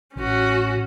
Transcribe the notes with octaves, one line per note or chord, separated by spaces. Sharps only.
A1 C#4 F#4